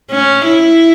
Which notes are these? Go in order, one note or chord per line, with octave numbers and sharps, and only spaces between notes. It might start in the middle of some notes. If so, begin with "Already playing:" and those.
C#4
E4